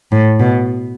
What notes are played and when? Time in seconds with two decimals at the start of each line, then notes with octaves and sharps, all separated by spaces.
0.12 A2
0.40 B2